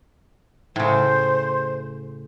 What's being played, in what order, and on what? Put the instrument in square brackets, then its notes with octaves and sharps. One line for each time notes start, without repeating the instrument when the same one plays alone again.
[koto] A2 C#3 [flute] C5